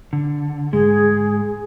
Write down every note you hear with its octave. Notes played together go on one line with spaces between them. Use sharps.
D3
G#2 G#3 G#4